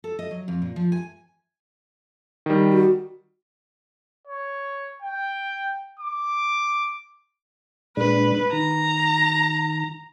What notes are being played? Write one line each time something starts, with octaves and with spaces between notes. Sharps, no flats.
A4
D#5
F#3
F2
A#2
F3
G#5
D#3 G3
F#4
C#5
G5
D6
A#2 G#3 D4 B4
D#3 A#5